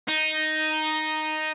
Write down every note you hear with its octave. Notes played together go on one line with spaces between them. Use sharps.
D#4